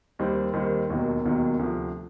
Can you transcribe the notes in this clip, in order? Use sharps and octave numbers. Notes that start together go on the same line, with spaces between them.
D#2 D#3 G3 C4
D#2 D#3 G3 C4
E1 D#2 D#3 F#3
E1 D#2 D#3 F#3
D2 C3 F3